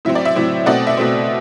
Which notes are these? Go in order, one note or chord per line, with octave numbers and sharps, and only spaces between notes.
A2 F#3 C4 E5
D5
E5
A2 F#3 C4
B2 A3 C4 D5 F#5
E5
B2 A3 C4